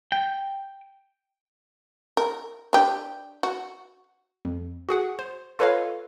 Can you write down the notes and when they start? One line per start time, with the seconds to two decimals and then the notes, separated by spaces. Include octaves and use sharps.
0.12 G5
2.17 A#4
2.73 D4 G4
3.43 F#4
4.45 F2
4.89 F#4 G#4 F#5
5.19 C5
5.59 F4 A4 B4 C#5 D#5 F5